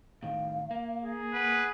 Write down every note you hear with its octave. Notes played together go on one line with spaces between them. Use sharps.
A2 D#3 F5
A#3
G#4
B4 F#5